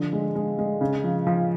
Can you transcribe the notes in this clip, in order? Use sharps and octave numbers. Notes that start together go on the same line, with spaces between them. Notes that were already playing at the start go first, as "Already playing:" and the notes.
Already playing: D3 F3
G#3
G#3
G#3
C#3
F3
F3